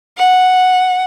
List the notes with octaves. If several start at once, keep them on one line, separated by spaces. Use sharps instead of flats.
F#5